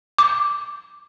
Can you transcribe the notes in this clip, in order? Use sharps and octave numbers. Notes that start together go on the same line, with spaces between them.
D6